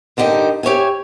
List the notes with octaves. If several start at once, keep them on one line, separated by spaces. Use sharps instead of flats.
G2 D3 A#3 D#4 G4
G4 C#5 E5 G#5